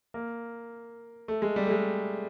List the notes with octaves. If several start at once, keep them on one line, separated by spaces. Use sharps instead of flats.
A#3
A3
G#3
G3
A3
G#3